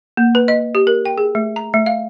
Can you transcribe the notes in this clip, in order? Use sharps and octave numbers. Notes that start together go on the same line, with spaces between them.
A#3
B4
D#5
G4
A#4
G5
G#4
A3
A#5
A3
F5